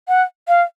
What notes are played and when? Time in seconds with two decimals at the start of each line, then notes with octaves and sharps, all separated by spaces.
0.08 F#5
0.48 F5